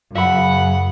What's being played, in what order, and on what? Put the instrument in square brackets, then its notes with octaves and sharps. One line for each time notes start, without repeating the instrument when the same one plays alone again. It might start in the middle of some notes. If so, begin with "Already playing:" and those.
[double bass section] F#2 [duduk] C#3 [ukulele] E5 B5 [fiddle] F#5